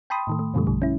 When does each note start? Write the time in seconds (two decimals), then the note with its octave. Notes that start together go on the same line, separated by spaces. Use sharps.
0.10 G5 A5 B5 C6 D#6
0.27 A2 D#3 A3
0.39 A3
0.54 F#2 B2 D3 F3 G3 A3
0.67 A#1 D3 G3
0.82 C#4 E4